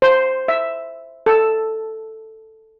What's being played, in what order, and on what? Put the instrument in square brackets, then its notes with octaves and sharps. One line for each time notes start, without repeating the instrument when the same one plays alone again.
[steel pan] C5
E5
A4